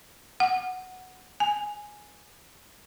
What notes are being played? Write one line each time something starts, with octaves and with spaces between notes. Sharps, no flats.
F#5
G#5